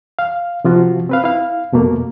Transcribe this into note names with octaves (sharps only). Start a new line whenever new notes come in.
F5
C3 F3 F4 F#4
C4 B4 F5
E4 F5
F2 B2 A3 A#3